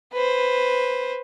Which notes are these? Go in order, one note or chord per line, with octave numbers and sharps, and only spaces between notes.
B4 C5